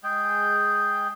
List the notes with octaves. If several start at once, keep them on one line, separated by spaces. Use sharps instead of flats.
G#3 G#4 G5